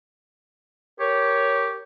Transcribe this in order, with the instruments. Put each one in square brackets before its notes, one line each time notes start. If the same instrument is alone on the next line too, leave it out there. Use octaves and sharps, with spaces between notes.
[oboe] G4 [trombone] A#4 [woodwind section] C#5